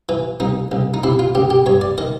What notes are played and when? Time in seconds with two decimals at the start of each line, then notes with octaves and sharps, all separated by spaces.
0.09 E3
0.40 C2 D#4
0.72 C2
0.94 D#4
1.03 C3 E4
1.19 F4
1.35 C#2 G4
1.50 G4
1.66 G2 C#5
1.81 D5
1.98 D#3 D#5